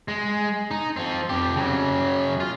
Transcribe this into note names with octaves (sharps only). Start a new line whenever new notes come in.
G#3
D#4
F3 C4
F2 G4
C#3 F#3
F4